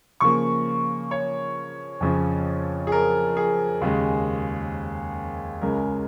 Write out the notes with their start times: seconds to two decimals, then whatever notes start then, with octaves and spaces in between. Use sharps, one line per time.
0.20 C#3 F3 A#3 C#6
1.11 C#5
2.01 F2 C#3 F3
2.87 G#4
2.92 A#4
3.37 G#4
3.81 D#2 C#3 G#3
5.61 C#2 C#3 G#3 A#4